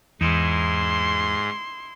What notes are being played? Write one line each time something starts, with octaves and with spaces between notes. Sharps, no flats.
E2 G#2 D#4 E4 C6